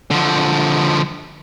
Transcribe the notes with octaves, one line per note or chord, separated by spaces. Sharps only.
D3 F3